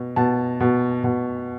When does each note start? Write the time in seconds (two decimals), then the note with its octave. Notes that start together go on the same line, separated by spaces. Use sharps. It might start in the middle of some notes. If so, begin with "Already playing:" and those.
Already playing: B2
0.16 B2 A5
0.60 B2
1.04 B2